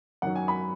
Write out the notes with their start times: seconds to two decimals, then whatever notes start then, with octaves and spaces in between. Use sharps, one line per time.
0.22 F#2 D#3 F#3 F#5
0.36 G#5
0.48 B5